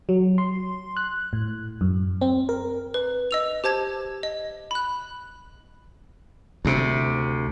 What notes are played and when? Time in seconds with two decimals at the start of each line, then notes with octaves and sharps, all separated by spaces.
0.09 F#3
0.38 C6
0.97 F#6
1.33 A2
1.81 F#2
2.21 C4
2.49 A#4
2.94 B4
3.31 D#5 E6 F7
3.64 G4 C5 A5 G#6
4.23 D#5
4.71 B5 F#6
6.65 D2 C3